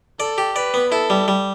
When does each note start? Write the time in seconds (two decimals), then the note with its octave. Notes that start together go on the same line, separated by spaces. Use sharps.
0.19 A4 D5
0.38 G4
0.56 B4 D5
0.74 B3
0.92 E4 A4
1.10 G3
1.28 G3